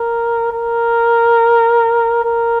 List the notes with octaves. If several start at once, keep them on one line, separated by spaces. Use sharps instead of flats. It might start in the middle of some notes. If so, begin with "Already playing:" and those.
Already playing: A#4
A#4
A#4